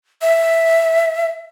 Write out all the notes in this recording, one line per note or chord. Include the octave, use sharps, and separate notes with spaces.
E5